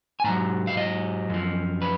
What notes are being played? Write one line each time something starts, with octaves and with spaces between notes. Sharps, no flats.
G#5
G#2 F#3 A#5
F5
D#5
F#2 F3
B4